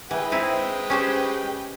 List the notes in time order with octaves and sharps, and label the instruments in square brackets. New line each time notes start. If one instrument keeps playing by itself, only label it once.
[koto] E3 [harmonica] G#3 B4 G5
[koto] C4 D#4 E4
C#4 G4 C5